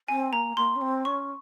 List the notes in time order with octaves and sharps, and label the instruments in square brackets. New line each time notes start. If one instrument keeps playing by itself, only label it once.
[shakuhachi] C4 [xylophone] G#5
[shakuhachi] A#3 [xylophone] A#5
[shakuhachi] A#3 [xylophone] C6
[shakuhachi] C#4
C4
[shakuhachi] C#4 [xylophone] C#6